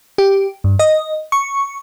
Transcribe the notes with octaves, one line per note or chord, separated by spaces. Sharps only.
G4
G2
D#5
C#6